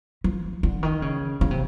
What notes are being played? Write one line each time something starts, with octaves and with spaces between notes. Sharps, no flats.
F3
D3
D#3
C#3
C#3
C3